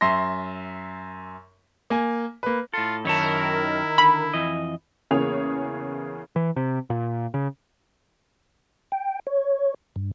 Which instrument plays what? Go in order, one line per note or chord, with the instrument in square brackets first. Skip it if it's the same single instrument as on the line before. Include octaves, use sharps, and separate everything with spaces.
[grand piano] F#2 E5 C6 A#6
A#3 G#5
A#3 B4
[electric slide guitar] A2 A4 [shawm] F4
[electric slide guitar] F#2 C#5 A5 [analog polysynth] D#3 A#4 [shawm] E4
[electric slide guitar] D3 [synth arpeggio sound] B5
[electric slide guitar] F2 E3 D#5
[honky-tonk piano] E2 C#3 A#3 G#4 C#5 F7
[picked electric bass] E3
C3
A#2
C#3
[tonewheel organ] G5
C#5
G2